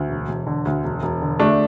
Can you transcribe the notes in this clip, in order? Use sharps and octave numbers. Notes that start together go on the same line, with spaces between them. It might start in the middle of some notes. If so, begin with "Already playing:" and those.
Already playing: D2
E1
E1
D3
D2
E1
E1
D3
D2 A3 D4